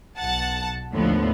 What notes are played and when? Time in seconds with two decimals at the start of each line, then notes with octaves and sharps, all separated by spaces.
0.18 B1 F#5 A5
0.93 D#2 A2 D3 F3 B3